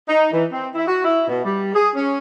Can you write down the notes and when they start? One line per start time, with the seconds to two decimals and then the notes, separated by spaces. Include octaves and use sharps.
0.08 D#4
0.32 E3
0.52 C4
0.75 E4
0.87 F#4
1.04 E4
1.28 B2
1.44 G3
1.74 G#4
1.95 C#4